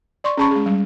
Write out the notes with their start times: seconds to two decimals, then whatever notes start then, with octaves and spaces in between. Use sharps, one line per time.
0.24 D5 C6 C#6
0.37 C#4 G#4 A5 B5 C#6
0.51 G#3 G#4
0.66 G3